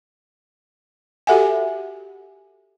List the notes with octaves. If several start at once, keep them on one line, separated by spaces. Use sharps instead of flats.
F#4 G4 A4 E5 F#5 G#5